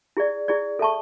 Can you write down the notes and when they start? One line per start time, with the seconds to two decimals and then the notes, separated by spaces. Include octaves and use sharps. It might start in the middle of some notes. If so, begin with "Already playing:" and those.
0.17 E4 G#4 D5
0.48 E4 G#4 D5
0.79 A4 E5 A5 C#6